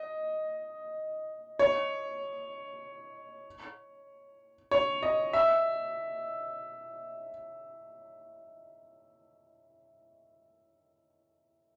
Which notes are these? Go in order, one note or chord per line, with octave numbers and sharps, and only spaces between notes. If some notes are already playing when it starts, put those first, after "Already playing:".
Already playing: D#5
C#5
C#5
D#5
E5